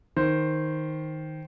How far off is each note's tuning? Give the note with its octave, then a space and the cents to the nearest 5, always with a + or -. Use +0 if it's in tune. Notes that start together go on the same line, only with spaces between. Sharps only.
D#3 +5 C5 +0